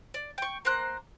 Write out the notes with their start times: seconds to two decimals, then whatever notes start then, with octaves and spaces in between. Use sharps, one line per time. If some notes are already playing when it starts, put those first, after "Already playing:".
0.14 D5
0.38 G5 C#6
0.65 A#3 C5 A#5 F#6